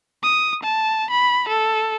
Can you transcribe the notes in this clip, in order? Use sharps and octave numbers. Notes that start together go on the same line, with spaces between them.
D#6
A5
B5
A4